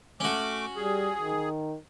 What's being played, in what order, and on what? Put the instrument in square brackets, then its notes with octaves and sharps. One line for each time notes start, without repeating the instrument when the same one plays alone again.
[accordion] A3 D6 [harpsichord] C#4 F#4
[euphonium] G3 [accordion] G#4
[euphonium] D#3